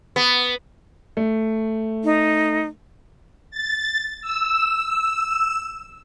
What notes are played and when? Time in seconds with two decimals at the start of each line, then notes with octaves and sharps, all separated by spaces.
0.16 B3
1.17 A3
2.04 D#4
3.51 A6
4.21 E6